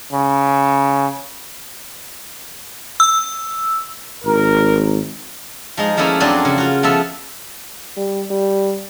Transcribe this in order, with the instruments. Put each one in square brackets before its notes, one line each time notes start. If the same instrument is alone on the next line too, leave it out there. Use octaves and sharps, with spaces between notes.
[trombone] C#3
[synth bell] E6
[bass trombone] G#1 [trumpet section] A#4
[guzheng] F3 G#3 D#4
F3 A3 A#3 C#4 E4
F2 F#3 C4 D4 D5 G#5
C#3
F4 F#4
F3 B3 A4 E5
[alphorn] G3
G3